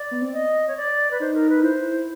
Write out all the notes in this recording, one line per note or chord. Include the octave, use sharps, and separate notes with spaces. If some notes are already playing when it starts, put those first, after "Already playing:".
Already playing: D5
B3
C4
D#5
C#5
D5
B4
D#4 C5
A#4
B4
E4 C5